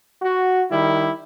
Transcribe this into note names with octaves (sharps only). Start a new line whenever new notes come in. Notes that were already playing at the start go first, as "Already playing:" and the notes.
F#4
D#3 G3 E4